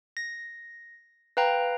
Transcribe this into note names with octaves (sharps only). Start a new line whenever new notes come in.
A#6
B4 F5 G5 A#5